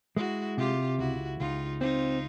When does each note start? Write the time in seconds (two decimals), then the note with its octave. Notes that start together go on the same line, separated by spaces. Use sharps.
0.17 G#3 E4 F#4
0.57 C3 F4 G4
0.99 C#2 E4 F#4
1.40 C#2 D#4 F4
1.81 C4 D#4 F4